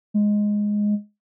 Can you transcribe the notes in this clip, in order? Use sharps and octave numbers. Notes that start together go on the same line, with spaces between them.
G#3